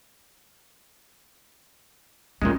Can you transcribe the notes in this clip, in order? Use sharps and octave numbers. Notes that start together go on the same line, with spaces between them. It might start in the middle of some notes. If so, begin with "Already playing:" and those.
A#2 G#3 C4 C#4